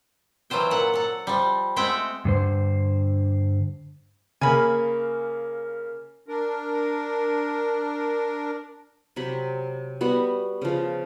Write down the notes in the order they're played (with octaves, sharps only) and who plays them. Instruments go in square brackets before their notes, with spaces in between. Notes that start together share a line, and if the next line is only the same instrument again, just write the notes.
[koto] E3 F#3 F4 C5 G5
A#2 F#5
A4 F#5
F3 G3
G#3 A3 C4 E5 F#5 G5
[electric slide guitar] G2 D3 C5
[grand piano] C#3 A#3 [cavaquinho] G#5 B5
[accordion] D4 A#4
[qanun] C3 F#3 B5
G3 B3 F#4
C#3 F3